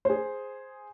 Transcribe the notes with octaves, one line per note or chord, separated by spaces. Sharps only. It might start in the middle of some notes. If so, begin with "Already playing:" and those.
G#4 C5